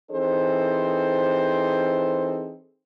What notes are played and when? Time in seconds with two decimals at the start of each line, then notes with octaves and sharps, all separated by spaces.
0.11 E3 C4 D#4 G#4 A4 C5